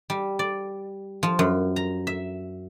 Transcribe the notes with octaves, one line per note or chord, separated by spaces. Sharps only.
G3
D5
F3
F#2
A#5
E5